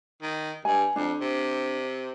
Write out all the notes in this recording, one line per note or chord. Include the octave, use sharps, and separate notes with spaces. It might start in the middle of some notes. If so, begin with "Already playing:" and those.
D#3
G2 G#5
F2 D4
C3